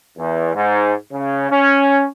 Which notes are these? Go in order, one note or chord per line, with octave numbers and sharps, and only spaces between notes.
E2
G#2
C#3
C#4